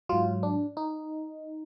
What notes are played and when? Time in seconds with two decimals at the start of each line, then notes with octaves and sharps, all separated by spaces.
0.09 G#2 F#3 F4
0.43 D4
0.77 D#4